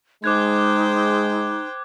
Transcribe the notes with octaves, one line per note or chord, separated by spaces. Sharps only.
G#3 D#4 C5 G5 D6 F#6 G#6